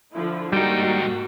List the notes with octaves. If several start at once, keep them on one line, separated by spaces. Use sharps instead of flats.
D3 F3 E4
G#2 G3 A#3 D#4 F#4 G5